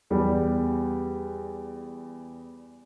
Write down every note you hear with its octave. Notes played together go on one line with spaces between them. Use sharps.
E2 G3